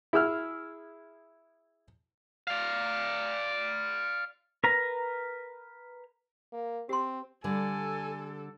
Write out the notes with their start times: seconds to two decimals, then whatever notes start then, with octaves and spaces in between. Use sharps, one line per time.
0.13 E4 G#4 E6 F6
2.48 D5 F5
4.64 A#4 B4 A#5
6.53 A#3
6.89 C4 G4 C6
7.44 D3 G3 A4 G#5